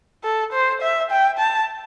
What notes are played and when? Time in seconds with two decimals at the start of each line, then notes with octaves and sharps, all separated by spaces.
0.24 A4
0.53 C5
0.82 E5
1.11 G5
1.39 A5